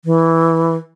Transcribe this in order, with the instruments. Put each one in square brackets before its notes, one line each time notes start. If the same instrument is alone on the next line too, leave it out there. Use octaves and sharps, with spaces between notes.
[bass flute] E3